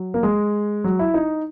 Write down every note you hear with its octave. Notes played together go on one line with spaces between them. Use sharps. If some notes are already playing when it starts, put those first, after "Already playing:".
Already playing: F#3
A#3
G#3
F#3
E4
D#4